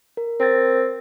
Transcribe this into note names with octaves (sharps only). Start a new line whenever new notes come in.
A#4
C4 A#4 A6